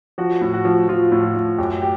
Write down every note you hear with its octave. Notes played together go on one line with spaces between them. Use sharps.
F3 F#4
A2
F#4
F3
F3 F4
A2
F4
A2
F#2 G4
G4